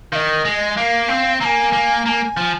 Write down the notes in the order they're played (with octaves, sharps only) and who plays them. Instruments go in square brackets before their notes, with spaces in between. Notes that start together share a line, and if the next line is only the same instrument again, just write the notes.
[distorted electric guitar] D#3 [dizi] D#5 F5
[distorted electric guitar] G#3
[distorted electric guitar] A#3 [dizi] F5
[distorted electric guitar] C4
[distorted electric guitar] A#3 [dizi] A#5
[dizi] G#5
[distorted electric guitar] A#3
[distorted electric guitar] A#3 [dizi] G#5 A#5
[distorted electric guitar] F3